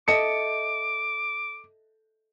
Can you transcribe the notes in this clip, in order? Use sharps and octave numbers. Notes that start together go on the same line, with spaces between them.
A4 D#5 E5 D6 C#7